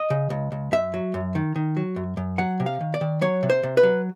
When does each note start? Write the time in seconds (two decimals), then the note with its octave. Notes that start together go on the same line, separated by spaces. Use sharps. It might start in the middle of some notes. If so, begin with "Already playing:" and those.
Already playing: D#5
0.10 C#3
0.30 C#2
0.52 C#2
0.72 F#2 E5
0.94 F#3
1.14 F#2
1.35 D#3
1.56 D#3
1.77 F#3
1.96 F#2
2.17 F#2
2.38 F#3 F#5
2.60 C3
2.66 F5
2.81 D#3
2.94 D5
3.01 D#3
3.21 F#3 C#5
3.43 C3
3.50 C5
3.63 C3
3.77 B4
3.83 F#3